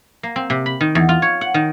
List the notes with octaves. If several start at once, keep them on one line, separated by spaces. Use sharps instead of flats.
A#3
C4
C3
B5
D#3
E2
F4
C#5
F#5
D#3